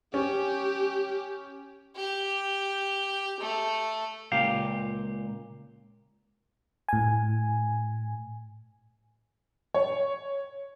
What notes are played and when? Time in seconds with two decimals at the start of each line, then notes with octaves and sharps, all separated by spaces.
0.14 C#4 G4
1.96 G4
3.40 A3
4.32 C#2 A#2 G4 F5
6.89 A2 G#5
9.74 C#5